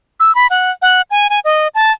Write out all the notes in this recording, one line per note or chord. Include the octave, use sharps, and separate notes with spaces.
E6
B5
F#5
F#5
G#5
G#5
D#5
A5